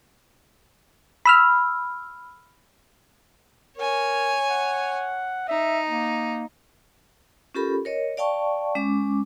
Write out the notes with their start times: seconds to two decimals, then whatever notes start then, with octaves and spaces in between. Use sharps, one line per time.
1.25 B5 E6 F6
3.77 A#4 C#5 G#5
4.49 F#5
5.48 D#4 E5
5.90 A#3
7.54 C#4 F4 G4 A4 A#4 B5
7.85 A#4 C#5 D#5
8.17 D5 F5 G5 A5 C#6
8.75 G#3 C#4 D6